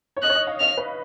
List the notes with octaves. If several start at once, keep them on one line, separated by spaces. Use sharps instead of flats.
C#5
D#5 F#6
C#5
D#5
F5
D#5 F6
B4